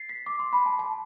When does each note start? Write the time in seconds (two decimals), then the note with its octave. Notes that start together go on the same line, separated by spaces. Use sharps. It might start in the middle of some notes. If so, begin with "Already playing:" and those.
Already playing: A6 C7
0.09 B6
0.26 D6
0.39 C6
0.53 B5
0.66 A5
0.79 A5